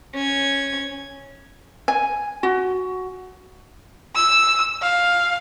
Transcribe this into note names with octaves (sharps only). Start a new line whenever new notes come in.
C#4 G#6
G#5
F#4
E6
F5